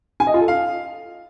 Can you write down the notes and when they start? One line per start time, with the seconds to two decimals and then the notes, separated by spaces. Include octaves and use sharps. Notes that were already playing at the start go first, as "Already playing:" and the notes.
0.20 G#5
0.27 D#5
0.34 F4
0.41 A4
0.48 F5